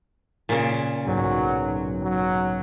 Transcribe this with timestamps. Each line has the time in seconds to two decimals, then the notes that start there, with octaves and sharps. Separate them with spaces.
0.49 A#2 C#3
1.07 B1 G#2 F#3
2.02 F#3